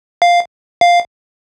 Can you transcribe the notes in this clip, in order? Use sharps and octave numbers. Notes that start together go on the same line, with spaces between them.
F5
F5